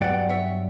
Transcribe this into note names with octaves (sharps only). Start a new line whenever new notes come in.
G2 F#3 B3 D5 F#5
C#5 E5